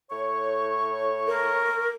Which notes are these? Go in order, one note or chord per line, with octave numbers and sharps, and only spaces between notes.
A2 C#5 C#6
A#4